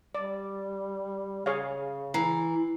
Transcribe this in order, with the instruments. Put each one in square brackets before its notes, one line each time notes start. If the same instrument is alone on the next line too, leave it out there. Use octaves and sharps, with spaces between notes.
[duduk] G3 [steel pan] D5
[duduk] C#3 [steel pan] G#4 C#5 F5
[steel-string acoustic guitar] E3 [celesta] A#5 C7